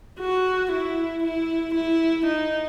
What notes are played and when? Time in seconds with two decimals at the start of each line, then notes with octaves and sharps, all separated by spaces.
0.20 F#4
0.72 E4
1.24 E4
1.75 E4
2.27 D#4